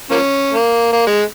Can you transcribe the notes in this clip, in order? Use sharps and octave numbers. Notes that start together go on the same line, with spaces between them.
F3 A#3 C#4
A#3
A#3
G#3